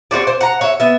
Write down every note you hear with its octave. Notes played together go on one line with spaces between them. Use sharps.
C4 F4 F#4 D5
C5
F#5 A#5
C#5 E5
B3 E5